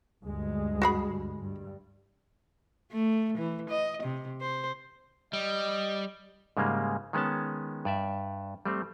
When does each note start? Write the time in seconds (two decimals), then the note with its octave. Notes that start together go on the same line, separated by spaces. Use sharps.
0.24 D2 G2 G#3
0.82 F#4 G#4 B5
1.39 G2
2.92 A3
3.38 E3
3.70 D#5
4.03 C3
4.40 C5
5.33 G3 D#5
6.57 G#2 C#3 G3 G#3 A#3
7.13 D#3 G#3 B3 C#4 A5
7.85 G2 D5 E5
8.65 G3 A3 C4